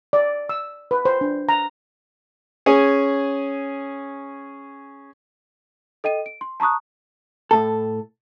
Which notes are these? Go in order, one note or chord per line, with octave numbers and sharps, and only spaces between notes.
D5
E6
B4
C5
D4
A#5
C#4 G#4
A4 D#5 G5 D#7
D7
C6
A5 A#5 C#6 D#6 F#6
A2 A4